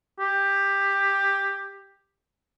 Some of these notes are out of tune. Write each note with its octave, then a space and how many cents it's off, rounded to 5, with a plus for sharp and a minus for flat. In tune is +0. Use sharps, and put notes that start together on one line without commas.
G4 +10